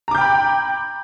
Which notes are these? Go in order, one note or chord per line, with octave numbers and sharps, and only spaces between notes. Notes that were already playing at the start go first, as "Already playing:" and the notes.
G5 A#5 B5 D6 G6